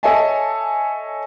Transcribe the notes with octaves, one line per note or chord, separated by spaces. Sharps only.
A4 C#5 D#5 E5 G#5 A5